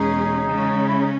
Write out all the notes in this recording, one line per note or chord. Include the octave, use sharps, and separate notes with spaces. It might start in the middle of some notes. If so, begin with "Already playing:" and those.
Already playing: E2 B2 G#3 C#4 D#4 G#4
C#3 G#3 C#4
E4
D#4